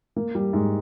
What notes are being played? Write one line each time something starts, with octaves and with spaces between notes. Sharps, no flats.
A#3
G3
G#2